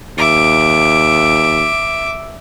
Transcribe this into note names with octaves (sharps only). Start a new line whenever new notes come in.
D#2 E5 D6